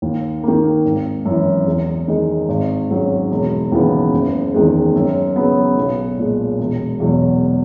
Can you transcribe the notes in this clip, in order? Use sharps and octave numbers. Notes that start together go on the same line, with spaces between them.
D#2
D#3 A#3
G#1
F#2 E3
E2
D#3 G#3 D#4 G#4
G#1
G#2 F#3 C#4 G#4
E1
D#2 C#3 E3 B3
F#1
E2 D#3 G#3
F#2
C#3 F#3 B3
B1
A#2 G#3
E1
E2 B2 F#3